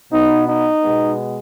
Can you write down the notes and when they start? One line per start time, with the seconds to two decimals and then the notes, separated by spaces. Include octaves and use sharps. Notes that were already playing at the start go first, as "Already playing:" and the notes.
0.12 B2 B3 D#4
0.48 D#4
0.83 B2 G#3 B3